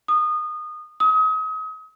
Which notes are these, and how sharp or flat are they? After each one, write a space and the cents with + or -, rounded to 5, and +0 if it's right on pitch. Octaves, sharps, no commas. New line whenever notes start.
D#6 -25
D#6 +35